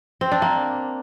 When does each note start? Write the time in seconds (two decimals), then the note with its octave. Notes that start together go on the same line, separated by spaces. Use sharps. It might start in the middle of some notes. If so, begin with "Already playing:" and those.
0.21 C4
0.32 D4
0.42 A#3